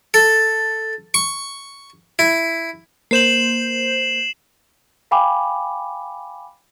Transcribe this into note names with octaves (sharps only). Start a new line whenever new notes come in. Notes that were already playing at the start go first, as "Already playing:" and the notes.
A4
C#6
E4
A#3 C5 G6 C7 E7 F#7
F5 G5 G#5 B5 D6